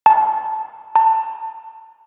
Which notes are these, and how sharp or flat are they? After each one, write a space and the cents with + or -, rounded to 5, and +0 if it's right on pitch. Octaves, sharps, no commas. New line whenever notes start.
A5 -10
A5 +25